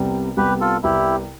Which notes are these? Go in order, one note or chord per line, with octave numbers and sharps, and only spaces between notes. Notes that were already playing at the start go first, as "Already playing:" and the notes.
Already playing: C2 C3 G3 B3
C2 C3 G3 B3 G4 B4
F4 A4
C2 C3 G3 B3 E4 G4